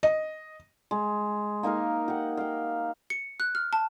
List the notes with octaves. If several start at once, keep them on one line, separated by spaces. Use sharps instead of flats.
D#5
G#3
A#3 D#4 A#4 F5
G4 F#5
F5 G5
C#7
F#6
F6
A5